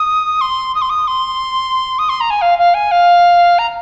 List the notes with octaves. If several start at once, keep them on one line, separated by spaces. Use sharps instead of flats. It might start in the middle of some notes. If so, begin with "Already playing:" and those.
Already playing: D#6
C6
D#6
C6
D#6
C6
D#6
C6
A#5
G#5
F5
F5
G#5
F5
A#5